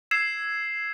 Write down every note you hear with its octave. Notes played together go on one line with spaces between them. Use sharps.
E6 G#6 C7 E7